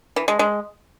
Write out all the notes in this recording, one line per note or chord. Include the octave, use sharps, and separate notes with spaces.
E3
G#3
G#3